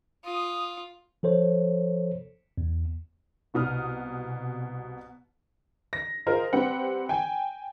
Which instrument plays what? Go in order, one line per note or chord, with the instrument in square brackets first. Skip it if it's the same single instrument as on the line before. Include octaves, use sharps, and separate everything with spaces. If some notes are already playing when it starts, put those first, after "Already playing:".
[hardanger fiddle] F4 [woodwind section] D#6
[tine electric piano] F3 A4 C5 C#5
E2
[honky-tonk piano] C2 B2 D#6 F6
A#6
F4 G#4 A#4 C5 D#5
G3 C4 G4 B4 F#5 G5
G5 G#5